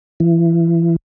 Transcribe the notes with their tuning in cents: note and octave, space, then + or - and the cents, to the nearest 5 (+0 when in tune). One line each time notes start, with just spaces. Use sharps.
E3 +30